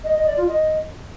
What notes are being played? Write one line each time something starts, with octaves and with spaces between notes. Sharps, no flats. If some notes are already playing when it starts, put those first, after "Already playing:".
D#5
D#5
D5
F4
D#5